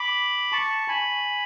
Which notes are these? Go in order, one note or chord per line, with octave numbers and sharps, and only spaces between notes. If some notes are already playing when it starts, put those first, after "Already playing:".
Already playing: B5 D6
A5 C#6
G#5 B5